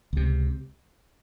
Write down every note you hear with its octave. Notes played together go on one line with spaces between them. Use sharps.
C#2 C3